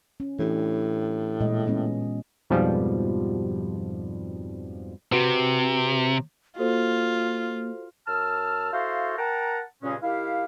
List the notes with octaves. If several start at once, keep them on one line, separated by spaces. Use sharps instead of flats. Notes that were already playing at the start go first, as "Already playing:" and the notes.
C#4
A2 E3 D4 G4
A#2 G#3 D#5
G#3 B3 C#4
F2 G#2 B2 F3 G3
C3 C4 F#4 B4
A#3 F4 F#4 A4 C5
F#2 A5 E6 F6
E4 F#4 A4 C5 F5
A#4 F#5 G5 A5 A#5
G2 A#2 C#3 G#3 C#4
D#3 E4 G4 F5